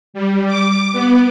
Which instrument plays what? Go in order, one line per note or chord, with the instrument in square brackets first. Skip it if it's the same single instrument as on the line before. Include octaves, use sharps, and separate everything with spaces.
[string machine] G3
D6
B3